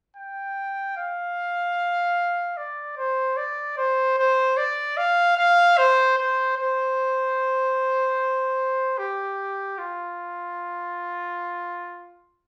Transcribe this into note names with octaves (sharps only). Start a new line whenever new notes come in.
G5
F5
D5
C5
D5
C5
C5
D5
F5
F5
C5
C5
C5
G4
F4